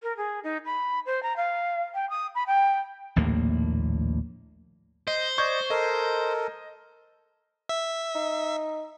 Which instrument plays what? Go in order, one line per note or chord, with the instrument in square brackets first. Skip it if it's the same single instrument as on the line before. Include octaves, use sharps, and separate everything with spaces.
[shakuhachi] A#4
G#4
D#4
B5
C5
A#5
F5
G5
D#6
B5
G5
[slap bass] A#1 D#2 A2 A#3
[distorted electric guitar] C5 [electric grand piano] D#5
[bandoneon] D5 D#5 [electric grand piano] C#6 G6 G#6
[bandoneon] A4 A#4 [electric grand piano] D#5
[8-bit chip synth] E5
[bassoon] D#4